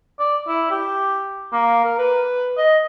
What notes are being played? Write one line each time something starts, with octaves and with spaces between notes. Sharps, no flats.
D5
E4
G4
A#3
A#4
B4
D#5